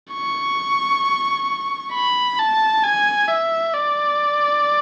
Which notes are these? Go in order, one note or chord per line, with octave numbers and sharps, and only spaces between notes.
C#6
B5
A5
G#5
E5
D5